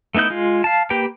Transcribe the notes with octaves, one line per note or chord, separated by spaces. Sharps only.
A3 B3 D#4 E4 G6
G#3 F4
F5 A5
A#3 G4 B4 G5